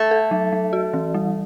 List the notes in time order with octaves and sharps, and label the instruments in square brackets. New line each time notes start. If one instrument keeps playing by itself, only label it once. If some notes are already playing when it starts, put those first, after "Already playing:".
Already playing: [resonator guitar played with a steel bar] A3
[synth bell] A4
F#3
F#3
F#4
E3
G3